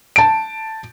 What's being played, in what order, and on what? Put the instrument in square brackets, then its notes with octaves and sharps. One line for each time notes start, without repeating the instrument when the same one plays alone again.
[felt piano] A5 D7